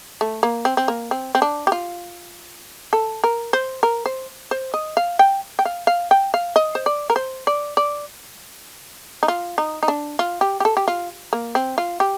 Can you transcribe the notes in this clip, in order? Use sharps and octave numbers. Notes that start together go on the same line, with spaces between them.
A3
A#3
C4
C4
A#3
C4
C4
D4
G4
F4
A4
A#4
C5
A#4
C5
C5
D#5
F5
G5
G5
F5
F5
G5
F5
D#5
C5
D5
A#4
C5
D5
D5
D#4
F4
D#4
D#4
D4
F4
G4
G4
A4
G4
F4
A#3
C4
F4
G4